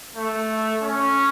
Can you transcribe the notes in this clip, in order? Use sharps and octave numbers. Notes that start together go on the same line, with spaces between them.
A3
C#4